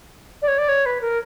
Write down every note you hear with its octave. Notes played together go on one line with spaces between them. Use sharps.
D5
C#5
D5
C#5
B4
A#4